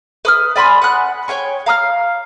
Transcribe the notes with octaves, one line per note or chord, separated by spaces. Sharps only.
B4 D#6 F6
D5 G#5 B5 C6
F#5 G#5 D#6 F#6
C#5 G5 G#5 C#6
F5 A#5 D#6 F6